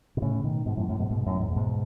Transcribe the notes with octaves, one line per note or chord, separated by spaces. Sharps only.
B2
A2 C#3
B2 D#3
G#2 B2
F#2 A2
F#2 A2
G#2 B2
G#2 B2
F#2 A2
E2 G#2
A2
G#2 B2